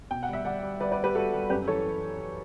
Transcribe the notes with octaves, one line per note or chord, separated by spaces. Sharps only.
B2 G5
F#5
G3 E5
G3 D5 F#5
G3
G3 B4 D5
B4 D5
G3
G4 B4
G3 F#4 A4
G3
F#2 G4 B4
E3 A4 C#5